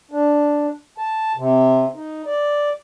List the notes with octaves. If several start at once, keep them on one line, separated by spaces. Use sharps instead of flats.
D4
A5
C3
D#4
D5